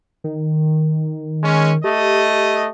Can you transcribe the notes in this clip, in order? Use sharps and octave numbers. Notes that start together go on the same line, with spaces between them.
D#3
G#3 C#4
A3 G4 D#5